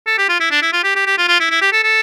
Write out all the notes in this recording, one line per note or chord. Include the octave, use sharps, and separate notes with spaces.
A4
G4
F4
E4
D4
E4
F4
G4
G4
G4
F4
F4
E4
E4
G4
A4
A4